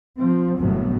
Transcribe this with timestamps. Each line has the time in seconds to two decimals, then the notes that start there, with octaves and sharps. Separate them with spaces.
0.18 F3 C4
0.57 G1 C2 A2 F#3 B3